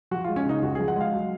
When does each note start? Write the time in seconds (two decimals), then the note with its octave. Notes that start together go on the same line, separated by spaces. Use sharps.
0.11 F3 F#4
0.24 F4
0.29 G#3
0.36 C#4
0.45 C#3 D#4
0.62 C#2 F#4
0.75 G#4
0.79 F3
0.88 F#5
0.96 G#3 F5
1.13 F#3